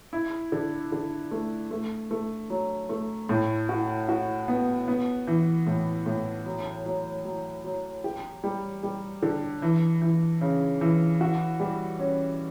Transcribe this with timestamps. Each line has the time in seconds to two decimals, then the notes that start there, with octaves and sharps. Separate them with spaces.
0.13 E4
0.52 D3
0.92 D3
1.31 A3
1.71 A3
2.11 A3
2.50 F#3
2.89 A3
3.29 A2
3.69 F#4
4.09 F#4
4.48 B3
4.88 B3
5.27 E3
5.67 A2
6.06 A2
6.46 F#3
6.85 F#3
7.25 F#3
7.64 F#3
8.04 G4
8.44 G3
8.83 G3
9.22 D3
9.62 E3
10.02 E3
10.41 C#3
10.81 E3
11.21 F#4
11.60 G3
11.99 C#4